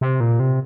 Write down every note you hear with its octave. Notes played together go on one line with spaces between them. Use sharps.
C3
A#2
C3